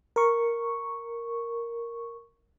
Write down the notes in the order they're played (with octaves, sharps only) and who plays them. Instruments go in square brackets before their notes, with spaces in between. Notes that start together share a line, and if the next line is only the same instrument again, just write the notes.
[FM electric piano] A#4 C#6